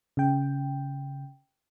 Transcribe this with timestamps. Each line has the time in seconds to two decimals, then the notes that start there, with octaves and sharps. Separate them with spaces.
0.17 C#3 G5